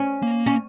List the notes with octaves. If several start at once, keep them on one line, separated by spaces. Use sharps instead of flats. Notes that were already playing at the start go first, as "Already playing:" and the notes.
Already playing: C#4
A#3
C#4